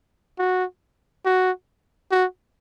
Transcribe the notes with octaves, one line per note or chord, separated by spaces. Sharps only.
F#4
F#4
F#4